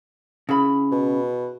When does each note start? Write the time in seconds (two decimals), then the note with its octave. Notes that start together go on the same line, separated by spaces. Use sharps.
0.49 C#3 E4 G#4 B5
0.92 B2